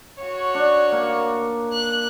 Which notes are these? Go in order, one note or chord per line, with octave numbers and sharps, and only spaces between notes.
F#4 C#5
D4
A#3
F#6